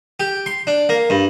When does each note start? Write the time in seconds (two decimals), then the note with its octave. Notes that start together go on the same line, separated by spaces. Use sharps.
0.20 G4
0.46 C6
0.67 D4
0.89 A#3
1.10 G2